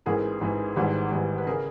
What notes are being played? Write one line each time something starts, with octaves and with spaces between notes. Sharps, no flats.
A1 G#2 E3 G#4 A#4
A1 G#2 E3
G#1 G#2 E3 G3
G#1 G#2 E3 G3
B4
C#3 G#4 A#4